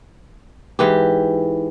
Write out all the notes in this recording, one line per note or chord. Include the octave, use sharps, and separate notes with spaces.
G#2 E3 G4